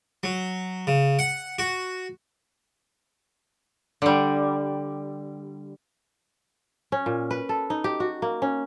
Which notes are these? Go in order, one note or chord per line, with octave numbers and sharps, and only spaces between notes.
F#3
C#3
F#5
F#4
D3 G3
C#4
A#2
B4
A4
D#4
G4
F#4
A#3
C#4